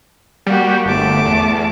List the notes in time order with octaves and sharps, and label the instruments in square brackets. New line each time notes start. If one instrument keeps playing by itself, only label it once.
[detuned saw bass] G3 [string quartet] A#3 F#4 G4
[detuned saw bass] G1 [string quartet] A3 A5 D6
[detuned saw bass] E2